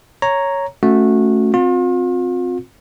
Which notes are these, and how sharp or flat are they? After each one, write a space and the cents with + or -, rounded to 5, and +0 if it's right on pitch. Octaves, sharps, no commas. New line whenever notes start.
C#5 +0 A#5 +0
A3 +0 C#4 +0 F#4 -20
C4 +0 F4 +40